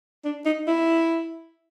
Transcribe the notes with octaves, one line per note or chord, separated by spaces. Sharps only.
D4
D#4
E4